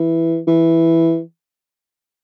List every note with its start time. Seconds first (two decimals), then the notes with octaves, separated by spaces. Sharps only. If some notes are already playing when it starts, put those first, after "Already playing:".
Already playing: E3
0.47 E3